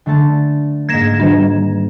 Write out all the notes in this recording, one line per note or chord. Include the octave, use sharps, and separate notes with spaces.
D3 A3 A5
G#2 A#3 G#6 A#6 E7
D#3 G3 D4